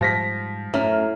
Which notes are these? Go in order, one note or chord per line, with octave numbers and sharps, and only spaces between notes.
G#2 F3 G3 A#6 B6
F#2 A2 A3 F6